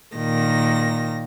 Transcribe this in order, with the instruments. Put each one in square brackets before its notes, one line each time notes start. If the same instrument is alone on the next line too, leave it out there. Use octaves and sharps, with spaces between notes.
[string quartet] A#2 D#3 A#6